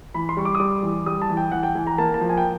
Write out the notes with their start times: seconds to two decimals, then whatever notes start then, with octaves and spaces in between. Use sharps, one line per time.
0.14 E3 B5
0.29 C6
0.37 G3 C#6
0.45 D6
0.55 D#6
0.60 G3 D6
0.83 E3
1.06 G3 D#6
1.22 A5
1.30 E3
1.37 G5
1.52 E3 F#5
1.63 G5
1.75 E3 G#5
1.87 A#5
1.98 A#3 A5
2.14 A5
2.21 F3
2.29 G#5
2.37 G5